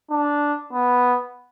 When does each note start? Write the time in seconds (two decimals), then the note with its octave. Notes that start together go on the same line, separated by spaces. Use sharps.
0.11 D4
0.73 B3